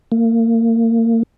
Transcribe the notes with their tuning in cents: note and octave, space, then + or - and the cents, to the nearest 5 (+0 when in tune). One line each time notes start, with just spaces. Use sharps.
A#3 -30